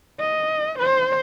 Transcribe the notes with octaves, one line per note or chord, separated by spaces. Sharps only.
D#5
C5